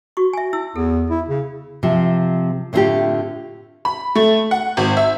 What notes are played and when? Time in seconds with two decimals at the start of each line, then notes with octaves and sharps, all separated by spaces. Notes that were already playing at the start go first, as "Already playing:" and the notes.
0.17 F#4 C#6
0.33 E5 G#5
0.53 E4 E6
0.76 E2 A4
1.10 E4
1.28 C#3
1.83 C3 F3
2.73 A2 D3 C4 D#4 F4 G4
3.85 B5
4.15 A3
4.51 F#5
4.77 G#1
4.97 E5